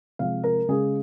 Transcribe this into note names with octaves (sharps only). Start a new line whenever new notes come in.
C3 F3 G#3 F5
A#4
C#3 G#3 G#4